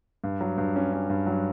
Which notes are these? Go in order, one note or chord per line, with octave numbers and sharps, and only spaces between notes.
G2
F#3
G2
C#4
C#4
G2
F#3